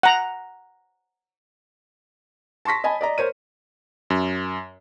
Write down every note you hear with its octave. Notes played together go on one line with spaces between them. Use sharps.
F#5 A#5
A5 C6 C#6 A#6 B6
D#5 G#5 A5 B5
D5 D#5 A#5
A#4 C5 C#5 D#7
F#2